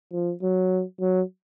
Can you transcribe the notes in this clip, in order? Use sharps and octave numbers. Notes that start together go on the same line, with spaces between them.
F3
F#3
F#3